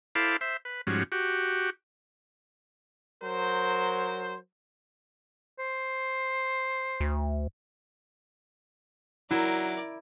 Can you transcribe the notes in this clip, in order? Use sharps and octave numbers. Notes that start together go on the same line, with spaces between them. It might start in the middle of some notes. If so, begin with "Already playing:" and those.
E4 A4 C5 F5 B5 D6
C5 E5
B4
G#2 F3 G3 C#4 F#4
F#4 G4
F#3 A#4 C5
C5
D2
F#3 E4 A#4 D5